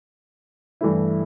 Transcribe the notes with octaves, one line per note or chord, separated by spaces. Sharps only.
G2 E3 A3 E4